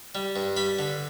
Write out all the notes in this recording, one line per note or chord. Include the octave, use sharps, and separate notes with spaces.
G3
G2
G3 B5
D3